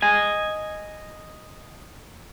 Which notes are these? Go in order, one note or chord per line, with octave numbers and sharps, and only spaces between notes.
D#5 G#5